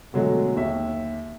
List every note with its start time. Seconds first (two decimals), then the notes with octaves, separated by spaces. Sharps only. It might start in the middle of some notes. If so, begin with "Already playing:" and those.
0.13 B2 D3 F#3 G#3 A3
0.56 D#2 E5